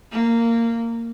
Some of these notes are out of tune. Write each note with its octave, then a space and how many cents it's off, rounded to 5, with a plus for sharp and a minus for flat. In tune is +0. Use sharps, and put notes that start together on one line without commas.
A#3 -15